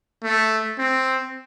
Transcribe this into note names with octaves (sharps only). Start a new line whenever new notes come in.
A3
C4